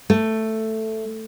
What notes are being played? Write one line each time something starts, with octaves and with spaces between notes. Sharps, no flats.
A3